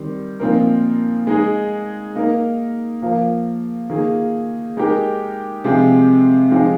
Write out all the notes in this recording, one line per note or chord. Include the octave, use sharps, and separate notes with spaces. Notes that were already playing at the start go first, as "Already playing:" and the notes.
Already playing: D#3 G3 C4
A#2 F3 C4 D#4 A#4
G#3 D#4 G#4
A#3 D#4 A#4
F3 A#3 F4 A#4
D#3 A#3 F4 G#4
G#3 D#4 G4 A#4
C3 F3 G#3 C4 G4
F3 G#3 D#4 G4